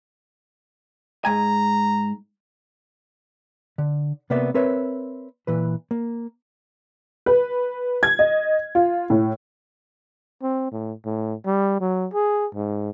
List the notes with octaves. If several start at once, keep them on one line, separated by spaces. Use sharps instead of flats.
G#2 G#5 A#5
D3
C3 A#3 B3 D5 E5
C4 A#4 B4 C#5 E5
A#2 E3 B4
A#3
B4
G#6
D#5
F4
A2
C4
A2
A2
G3
F#3
G#4
G#2